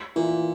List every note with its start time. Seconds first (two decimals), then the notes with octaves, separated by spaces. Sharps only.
0.16 A#2 E3